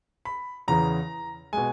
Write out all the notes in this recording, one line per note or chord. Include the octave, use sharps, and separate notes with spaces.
B5
E2 C#3 E3 A#5
B2 G#3 G#5